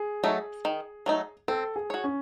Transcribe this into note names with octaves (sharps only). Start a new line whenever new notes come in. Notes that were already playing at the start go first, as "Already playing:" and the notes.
Already playing: G#4
F#3 A3 D#4
D#3
F#3 A3 D#4
C4 A4
G#4
F#4 C#5
C#4